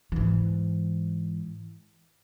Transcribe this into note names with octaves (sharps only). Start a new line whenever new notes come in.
G#2 E3